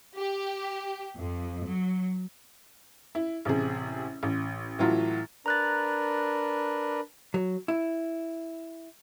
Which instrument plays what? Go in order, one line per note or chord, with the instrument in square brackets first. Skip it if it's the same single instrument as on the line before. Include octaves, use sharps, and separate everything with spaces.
[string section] G4
F2
F#3
[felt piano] E4
A1 C3 G#4
A1
A2 E3 F#3 F4
[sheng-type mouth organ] D4 A#4 B4 [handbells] A#5 F#6 A6
[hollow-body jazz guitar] F#3
E4